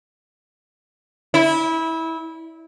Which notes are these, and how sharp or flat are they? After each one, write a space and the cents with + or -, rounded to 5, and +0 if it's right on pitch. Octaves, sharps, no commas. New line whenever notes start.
E4 -20